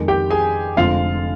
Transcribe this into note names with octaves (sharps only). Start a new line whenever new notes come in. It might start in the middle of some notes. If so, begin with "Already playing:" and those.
Already playing: F2 D#3 G#3
G4 G5
G#4 G#5
F1 F2 D3 G#3 C4 F4 F5